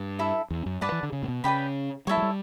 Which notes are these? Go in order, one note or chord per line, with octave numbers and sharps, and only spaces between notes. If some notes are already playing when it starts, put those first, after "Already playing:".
Already playing: G2
E4 A4 E5
E2
F#2
G2 B4 D5 F#5 A5
E3
D3
C#3
A2
B2
C#3 B4 D5 G5 B5
G3 E4 A4 C#5
F#3
G3